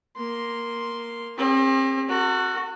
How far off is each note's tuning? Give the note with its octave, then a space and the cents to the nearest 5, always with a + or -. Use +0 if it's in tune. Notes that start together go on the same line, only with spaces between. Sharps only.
A#3 +5 C6 +0
C4 +35 G#4 -40
F#4 +0 A4 +45